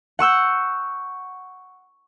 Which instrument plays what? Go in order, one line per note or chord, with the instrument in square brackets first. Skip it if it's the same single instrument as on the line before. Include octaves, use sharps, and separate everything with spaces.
[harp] F#5 C#6 E6 G6